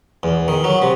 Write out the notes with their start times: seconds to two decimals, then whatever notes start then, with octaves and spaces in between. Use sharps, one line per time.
0.23 E2
0.48 D#3
0.64 F#3
0.82 C3